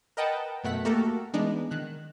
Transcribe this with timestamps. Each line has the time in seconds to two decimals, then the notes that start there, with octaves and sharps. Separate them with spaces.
0.17 A#4 B4 D#5 F#5 G5 A5
0.64 F#2 B2 A3 F#5 B6
0.85 A3 A#3 F#4 G4 A4 A#4
1.34 E3 G#3 B3 D4 D#4
1.71 D#3 F#6